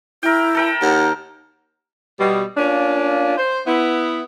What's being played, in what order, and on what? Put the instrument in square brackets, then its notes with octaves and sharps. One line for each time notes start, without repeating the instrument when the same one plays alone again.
[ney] E4 [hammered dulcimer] A#4 G5
[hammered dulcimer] A4 A#4 G5
[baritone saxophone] D#2 [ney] F#5
[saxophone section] B2 G3
A#3 C#4 D4 F4
C5
B3 E4